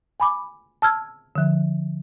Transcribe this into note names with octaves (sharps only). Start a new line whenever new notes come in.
G#5 B5 D6
A5 E6 F6 G#6
D3 F3